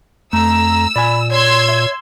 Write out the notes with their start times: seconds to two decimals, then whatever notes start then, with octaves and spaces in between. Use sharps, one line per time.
0.33 F2 A3 A#5 E6
0.96 A#2 D5 G#5 B5
1.30 C#5 C6 E6 G#6
1.69 E5